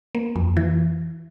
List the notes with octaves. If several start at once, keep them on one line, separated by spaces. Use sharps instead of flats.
A#3
F2
E3